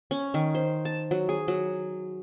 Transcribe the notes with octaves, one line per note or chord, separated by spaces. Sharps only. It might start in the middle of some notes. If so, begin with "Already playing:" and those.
C#4
D#3
C5
A5
F#3
G#4
F#3